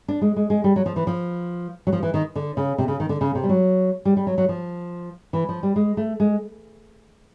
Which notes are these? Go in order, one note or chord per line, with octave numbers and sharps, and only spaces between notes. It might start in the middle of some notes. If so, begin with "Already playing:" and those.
D4
G#3
G#3
G#3
G3
F#3
F3
E3
F3
F#3
F3
E3
D#3
D3
C#3
C3
C#3
D#3
D3
C#3
C3
G3
F#3
G3
G3
F#3
F#3
F3
E3
F3
G3
G#3
A3
G#3